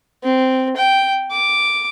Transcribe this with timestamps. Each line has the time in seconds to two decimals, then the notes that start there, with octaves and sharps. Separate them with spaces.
0.24 C4
0.77 G5
1.31 D6